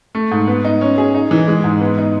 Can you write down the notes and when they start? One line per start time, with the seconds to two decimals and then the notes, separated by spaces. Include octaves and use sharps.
0.15 A3
0.31 G#2
0.48 B3
0.64 D#4
0.81 C#4
0.98 G#4
1.14 D#4
1.31 E3
1.48 G#3
1.64 G#2
1.81 B3
1.98 D#4